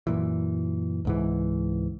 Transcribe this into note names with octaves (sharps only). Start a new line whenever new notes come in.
F#2 A#2 E3
C#2 G#2 E3